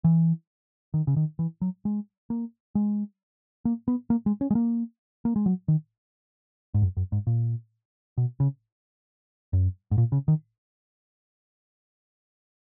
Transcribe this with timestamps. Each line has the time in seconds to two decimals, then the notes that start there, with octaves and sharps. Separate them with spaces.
0.04 E3
0.94 D#3
1.07 C#3
1.16 D#3
1.39 E3
1.61 F#3
1.85 G#3
2.30 A#3
2.75 G#3
3.65 A#3
3.88 B3
4.10 A#3
4.26 G#3
4.41 C#4
4.51 G#3
4.55 A#3
5.25 A#3
5.36 G#3
5.46 F#3
5.68 D#3
6.74 G#2
6.82 F#2
6.97 F#2
7.12 G#2
7.27 A#2
8.18 B2
8.40 C#3
9.53 F#2
9.91 G#2
9.98 A#2
10.12 C#3
10.28 D#3